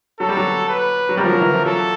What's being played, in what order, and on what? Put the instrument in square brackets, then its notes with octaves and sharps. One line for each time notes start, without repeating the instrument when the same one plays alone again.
[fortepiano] F#3 [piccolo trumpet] A4
[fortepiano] G3
F#3
[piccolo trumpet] B4
[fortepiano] F#3
[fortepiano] G3 [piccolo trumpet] A#4
[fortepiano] F3
F#3
E3
F3
[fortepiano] F#3 [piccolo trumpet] A4